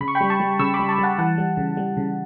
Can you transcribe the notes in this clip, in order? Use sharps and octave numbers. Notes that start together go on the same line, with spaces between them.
C#3 B5
C#6
G5 B5
G3
A5 C#6
G3
C#3 C#6 E6
B5 D6
G3
A5 C#6
G3
F#5 A5
E3 F#5 A5
G3
C#3
G3
C#3